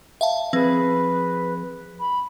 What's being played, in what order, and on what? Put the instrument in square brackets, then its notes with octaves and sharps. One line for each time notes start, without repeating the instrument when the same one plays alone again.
[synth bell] E5 F5 A5
[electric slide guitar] F3 G#4 [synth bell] C4 [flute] B4
[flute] B5